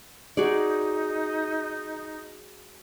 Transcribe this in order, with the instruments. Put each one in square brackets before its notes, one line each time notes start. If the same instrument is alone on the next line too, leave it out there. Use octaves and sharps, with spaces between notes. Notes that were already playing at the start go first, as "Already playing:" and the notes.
[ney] D#4 [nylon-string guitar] F#4 G#4 D5